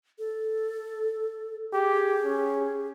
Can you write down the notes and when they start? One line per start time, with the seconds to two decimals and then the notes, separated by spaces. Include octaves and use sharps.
0.19 A4
1.73 G4 G#4
2.24 C#4